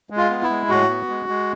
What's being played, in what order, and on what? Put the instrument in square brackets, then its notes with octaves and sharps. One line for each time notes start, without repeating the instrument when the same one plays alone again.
[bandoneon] G#3
F4
B3
E4
G#3
A2 F#4
B3
G#3
G#3